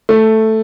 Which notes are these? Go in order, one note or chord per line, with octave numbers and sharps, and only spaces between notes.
A3